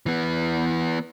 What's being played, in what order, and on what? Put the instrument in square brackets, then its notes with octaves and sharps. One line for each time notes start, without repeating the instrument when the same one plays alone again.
[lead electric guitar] E3 B3